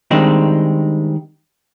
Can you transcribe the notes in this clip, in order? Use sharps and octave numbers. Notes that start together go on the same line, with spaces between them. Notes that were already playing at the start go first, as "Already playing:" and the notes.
D#3 G3 G#3 C4 D4 D#4